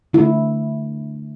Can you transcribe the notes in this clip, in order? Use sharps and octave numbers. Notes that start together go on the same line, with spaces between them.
D3 A3 E4